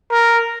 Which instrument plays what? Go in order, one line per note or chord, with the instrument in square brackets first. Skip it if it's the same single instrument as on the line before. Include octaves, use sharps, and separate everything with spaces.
[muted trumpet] A#4